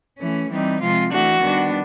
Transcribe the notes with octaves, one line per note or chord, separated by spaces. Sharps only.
E3 A3 C#4
E3 G3 C4 D#4
C3 F3 G#3 F4
E3 A3 D4 F#4
D#3 G3 B3 D4